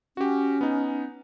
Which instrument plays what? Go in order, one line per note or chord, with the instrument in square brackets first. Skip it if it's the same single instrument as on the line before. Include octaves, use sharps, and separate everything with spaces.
[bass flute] C#4 [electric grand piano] F#4 G4
[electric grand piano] B3 D#4